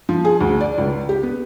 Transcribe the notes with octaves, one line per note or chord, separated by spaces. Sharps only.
F3
G#4
D2
D5
C#2
G4
B3